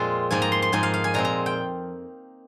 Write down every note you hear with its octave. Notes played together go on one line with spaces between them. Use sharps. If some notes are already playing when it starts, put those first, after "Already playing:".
Already playing: F2 A#2 F3 G#3 C4 F4 G#4
G#2 F3 A#3 D#4 G#5
A#5
C6
C6
G#2 F3 A#3 D#4 G#5
F5
F5
G#5
A#2 G#3 C4 A#5
A#5
G5